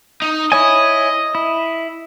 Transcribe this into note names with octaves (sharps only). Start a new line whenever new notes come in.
D#4
E4 C#5 D#5 G#5
E4